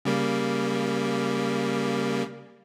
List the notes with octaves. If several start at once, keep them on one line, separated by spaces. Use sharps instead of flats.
C#3 G3 A#3